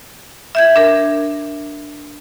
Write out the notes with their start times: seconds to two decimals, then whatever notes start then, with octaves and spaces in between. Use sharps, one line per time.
0.55 E5 G6 G#6
0.76 D4 A#4